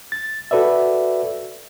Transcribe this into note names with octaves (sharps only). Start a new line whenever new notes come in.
A6
F#4 A4 B4 D5 E5